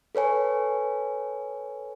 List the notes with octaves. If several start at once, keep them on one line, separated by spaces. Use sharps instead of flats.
A4 B4 C#5 G#5